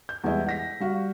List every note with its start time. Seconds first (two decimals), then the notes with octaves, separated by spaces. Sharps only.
0.09 G6
0.24 E2 G3 G#3 E4 D#5
0.47 F#5 A#6 B6
0.80 G3 F#4 F5